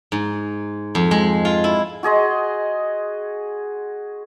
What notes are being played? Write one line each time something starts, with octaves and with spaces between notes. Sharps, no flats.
G#2
F2
G#3
F4
E4
F#4 G#4 D#5 C6